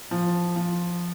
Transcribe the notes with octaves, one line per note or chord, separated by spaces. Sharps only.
F3
F3